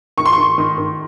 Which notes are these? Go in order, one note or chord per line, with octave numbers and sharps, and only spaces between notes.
D#3 C#6
C6
C#6
D#3
D#3
D#3